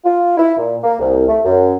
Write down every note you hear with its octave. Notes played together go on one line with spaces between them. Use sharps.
F4
E4
A#2
A#3
C2
A3
F#2